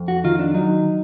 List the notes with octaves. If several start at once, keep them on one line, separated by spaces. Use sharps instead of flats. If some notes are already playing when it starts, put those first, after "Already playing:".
Already playing: F2
F#4
D#3 F4
D4
F#3 D#4